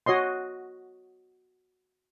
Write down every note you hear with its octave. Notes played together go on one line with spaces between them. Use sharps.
F#4 C#5 D#5 C6